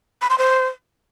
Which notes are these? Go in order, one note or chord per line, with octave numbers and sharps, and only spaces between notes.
B5
C6
C5